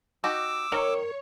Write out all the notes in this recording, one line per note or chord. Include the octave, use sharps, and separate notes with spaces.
D#4 F#4 G4 D6 E6
D#3 A#4 C#5